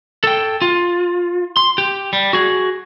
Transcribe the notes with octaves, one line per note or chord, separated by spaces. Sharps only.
A4 G5
F4
C6
G4
G3
F#4 G#4